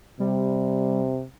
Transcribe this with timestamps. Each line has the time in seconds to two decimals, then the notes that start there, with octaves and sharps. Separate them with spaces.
0.20 C3 G3